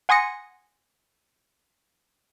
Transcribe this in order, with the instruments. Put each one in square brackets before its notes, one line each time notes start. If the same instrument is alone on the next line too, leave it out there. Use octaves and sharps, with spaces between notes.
[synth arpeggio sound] F#5 G#5 C6 D#6 A#6 C#7